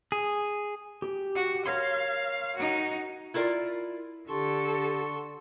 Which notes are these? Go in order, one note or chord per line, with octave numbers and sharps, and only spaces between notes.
G#4
G4
F#4
A#4 C#5 F5 C6
D#4 F#4
E4 F4 A#4 D5
D3 G4 A4 A5 C6 C#6